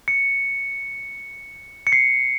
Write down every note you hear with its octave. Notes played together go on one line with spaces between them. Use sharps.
C#7
C#7
C7